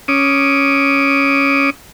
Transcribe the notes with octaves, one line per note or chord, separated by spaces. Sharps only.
C#4 D6 D#6